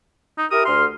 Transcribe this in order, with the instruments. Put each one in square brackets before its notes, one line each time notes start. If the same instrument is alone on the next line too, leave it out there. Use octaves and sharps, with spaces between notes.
[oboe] D#4
[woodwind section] E4 G4 A#4 [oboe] D#6
[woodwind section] D2 F6 [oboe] C6